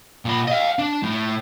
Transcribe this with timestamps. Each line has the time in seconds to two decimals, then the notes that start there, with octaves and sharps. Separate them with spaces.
0.25 A#2 B5
0.47 D#5 F5
0.79 D4
1.03 A2